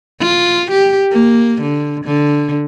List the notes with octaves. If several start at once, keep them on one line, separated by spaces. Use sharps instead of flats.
F4
G4
A#3
D3
D3